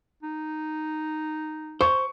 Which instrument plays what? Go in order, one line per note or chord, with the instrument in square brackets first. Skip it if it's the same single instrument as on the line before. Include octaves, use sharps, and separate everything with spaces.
[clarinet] D#4
[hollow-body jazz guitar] C5 [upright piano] C#6